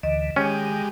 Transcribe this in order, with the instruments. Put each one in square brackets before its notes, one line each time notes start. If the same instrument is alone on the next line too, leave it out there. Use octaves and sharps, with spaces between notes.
[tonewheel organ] D2 D3 E3 [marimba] D#5
[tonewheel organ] D#3 [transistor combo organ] G#3 G4 [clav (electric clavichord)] C#4